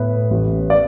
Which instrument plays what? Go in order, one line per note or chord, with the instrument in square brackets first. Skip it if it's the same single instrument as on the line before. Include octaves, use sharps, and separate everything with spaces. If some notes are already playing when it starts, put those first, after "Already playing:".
Already playing: [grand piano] A2 B3 B4
A1
D5